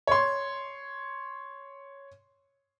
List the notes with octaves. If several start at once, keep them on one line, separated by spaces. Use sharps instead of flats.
C#5 C6